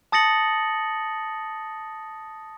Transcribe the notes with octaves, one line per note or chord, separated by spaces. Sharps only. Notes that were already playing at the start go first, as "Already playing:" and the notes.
A5 D#6 A6 A#6 C#7 F#7